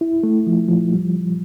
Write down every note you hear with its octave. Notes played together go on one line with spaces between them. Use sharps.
E4
A3
F3
F3
G3